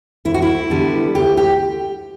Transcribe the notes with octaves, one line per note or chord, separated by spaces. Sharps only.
D2 E4
F#4
E4
D3 G3 B3
D2 G4
G4